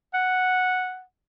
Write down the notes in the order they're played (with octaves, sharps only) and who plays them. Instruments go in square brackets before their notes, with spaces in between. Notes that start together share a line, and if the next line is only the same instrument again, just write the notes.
[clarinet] F#5